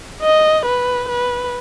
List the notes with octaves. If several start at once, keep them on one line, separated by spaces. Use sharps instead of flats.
D#5
B4
B4